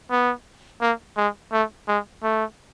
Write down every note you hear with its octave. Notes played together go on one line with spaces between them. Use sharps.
B3
A#3
G#3
A3
G#3
A3